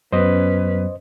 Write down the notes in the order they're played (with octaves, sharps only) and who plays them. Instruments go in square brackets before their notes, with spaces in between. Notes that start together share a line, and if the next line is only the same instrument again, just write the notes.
[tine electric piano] F#2 F#3 B3 [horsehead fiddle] C#4 B4 [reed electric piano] C5 D#5